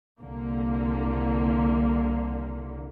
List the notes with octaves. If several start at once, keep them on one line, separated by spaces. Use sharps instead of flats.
C2 D3 A#3